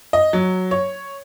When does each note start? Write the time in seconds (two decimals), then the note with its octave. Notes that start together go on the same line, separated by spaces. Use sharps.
0.13 D#5
0.33 F#3
0.71 C#5